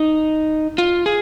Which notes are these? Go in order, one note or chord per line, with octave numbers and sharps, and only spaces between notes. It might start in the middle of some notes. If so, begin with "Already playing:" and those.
Already playing: D#4
F4
G#4